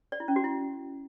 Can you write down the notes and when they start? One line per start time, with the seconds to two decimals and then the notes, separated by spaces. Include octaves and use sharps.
0.12 D5
0.20 E4
0.28 C#4
0.36 F#4
0.44 E4